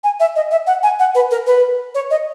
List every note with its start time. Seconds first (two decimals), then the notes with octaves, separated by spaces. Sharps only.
0.04 G#5
0.20 E5
0.36 D#5
0.51 E5
0.67 F#5
0.83 G#5
0.99 F#5
1.15 B4
1.31 A#4
1.47 B4
1.95 C#5
2.11 D#5